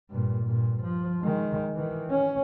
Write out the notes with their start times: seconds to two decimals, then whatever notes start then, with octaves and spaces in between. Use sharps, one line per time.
0.10 G2 A#2
0.44 G2 A#2
0.83 F3
1.22 D#3 G#3
1.75 D#3 E3
2.10 C#4